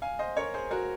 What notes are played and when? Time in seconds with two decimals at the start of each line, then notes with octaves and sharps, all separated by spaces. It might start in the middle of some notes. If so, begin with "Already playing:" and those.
0.02 F5 G#5
0.19 C5 D#5
0.37 A#4 C#5
0.54 G#4 C5
0.71 F#4 A#4